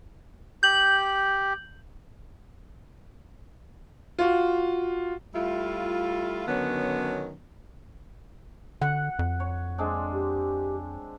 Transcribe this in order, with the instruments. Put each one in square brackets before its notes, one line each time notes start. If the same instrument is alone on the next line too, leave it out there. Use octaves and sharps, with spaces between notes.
[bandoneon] G4 [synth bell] G6 F#7
[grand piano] F4 F#4
[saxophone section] G3 A3 E4 F4
D3 D#3 F#3 B3 C#4
[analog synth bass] D3 [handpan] F#5
[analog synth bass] F2
[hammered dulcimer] C#5
G#3 C4 D4
[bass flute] G4